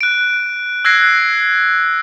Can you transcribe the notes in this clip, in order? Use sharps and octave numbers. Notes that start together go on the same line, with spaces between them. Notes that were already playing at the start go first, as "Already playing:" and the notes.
F#6 D7
E6 F#6 G#6 A#6 C7 D7